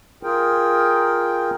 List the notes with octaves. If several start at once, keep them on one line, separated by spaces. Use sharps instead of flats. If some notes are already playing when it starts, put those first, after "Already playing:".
F4 G#4 A#4 G5